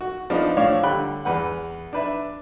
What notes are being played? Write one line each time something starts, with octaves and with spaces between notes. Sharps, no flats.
F#4
F3 B3 D4 D#4
A2 F3 D4 C#5 F5
D3 G3 G5 B5 F#6
E2 B4 F#5
D4 B4 E5